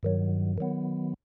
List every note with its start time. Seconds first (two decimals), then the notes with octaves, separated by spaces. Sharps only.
0.03 G2 D#3 F#3
0.58 D#3 F#3 B3